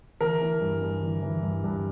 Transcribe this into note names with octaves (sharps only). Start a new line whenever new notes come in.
E3 A#4
E3
G2
G2
E3
E3
G2
G2